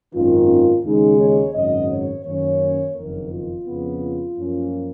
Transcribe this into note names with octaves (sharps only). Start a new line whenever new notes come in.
G#1 F#2 D#3 A#3 C#4 F4
D#2 C#3 G#3 D#4
C#5
G#1 F#2 C#3 F#3 D#5
C#5
F#2 D#3 A#3 C#4 C#5
F#1 F2 D#3 A#3 A#4
F4
F2 C#3 F3 B3
F4
F#2 F3 A#3 C#4